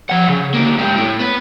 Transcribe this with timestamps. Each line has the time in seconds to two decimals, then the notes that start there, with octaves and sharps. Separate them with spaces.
0.09 F3 F#5
0.28 C#3
0.54 D2 A#3
0.77 G#2 G4
0.96 A2 A3
1.19 B3 B4